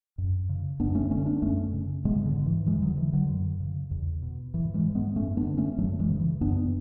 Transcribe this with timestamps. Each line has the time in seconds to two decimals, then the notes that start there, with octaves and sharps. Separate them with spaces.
0.18 F#2
0.49 C#3
0.80 F#2 B3 D4
0.95 A3 C#4
1.11 D3 A3 C#4
1.26 B3 D4
1.42 F#2 A3 C#4
1.73 C#3
2.05 G#2 G#3 B3
2.26 D3
2.36 G#2
2.46 E3
2.66 E2 E3 G#3
2.82 D3 F#3
2.97 D3 E3
3.13 D3 F#3
3.29 F#2
3.60 C#3
3.91 E2
4.22 B2
4.54 G#2 E3
4.74 E3 G#3
4.86 G#2
4.95 G#3 B3
5.16 F#2 A3 C#4
5.37 B3 D4
5.47 D3
5.57 A3 C#4
5.78 F#2 F#3 A3
6.00 E3 G#3
6.10 C#3
6.20 E3
6.41 F#2 B3 D4